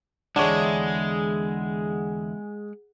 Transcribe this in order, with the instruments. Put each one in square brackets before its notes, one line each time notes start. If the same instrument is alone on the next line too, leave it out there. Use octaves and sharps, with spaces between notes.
[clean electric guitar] E2 D3 E4 [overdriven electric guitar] G#3 [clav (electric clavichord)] D4 C#5 [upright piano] G#4 F#5